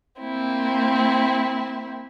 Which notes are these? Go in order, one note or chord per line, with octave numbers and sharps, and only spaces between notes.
A#3 C4 E4